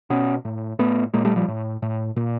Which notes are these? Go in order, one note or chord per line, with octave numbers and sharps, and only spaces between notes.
B2 B3 C#4
A2
A2 A3 B3
A#2 G#3 A#3
G3 A3
F3 G3
A2
A2
A#2